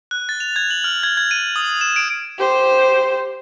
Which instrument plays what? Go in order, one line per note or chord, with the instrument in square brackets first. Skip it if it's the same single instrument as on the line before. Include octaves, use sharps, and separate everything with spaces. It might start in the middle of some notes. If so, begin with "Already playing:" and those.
[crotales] F#6
A6
F7
G#6
F#7
F6
G#6
G#6
D#7
D#6
E7
D7
[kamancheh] G4 C5